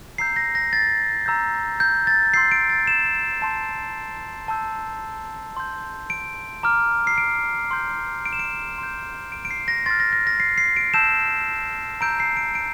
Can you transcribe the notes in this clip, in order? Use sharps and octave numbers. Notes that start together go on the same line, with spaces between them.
A#5 E6 G6 C7
A#6
A#6
A6
A#5 E6 G6
G6
A6
C6 E6 G6 C7
D7
A6
E7
A5 C6 G6
A5 E6 G6
C6 G6
D7
A#5 D6 F6
C7
D7
C6 G6
D7
E7
D7
C6 G6
D7
D7
C7
A#6
C6 F6 A6
A#6
A#6
A#6
C7
C7
D7
A5 E6 G6 E7
A#5 E6 G6 D7
C7
D7
D7